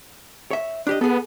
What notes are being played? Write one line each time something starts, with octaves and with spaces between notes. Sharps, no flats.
C#5 E5
D4 G4 D#5
B3 G#4 A4